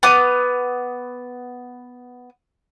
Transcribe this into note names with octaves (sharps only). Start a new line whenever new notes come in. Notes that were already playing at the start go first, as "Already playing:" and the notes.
B3 D6 D#6